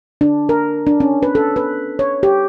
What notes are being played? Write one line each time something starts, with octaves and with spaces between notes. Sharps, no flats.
D4
A#4
D4
C#4
B4
A4
B4
C#5
G4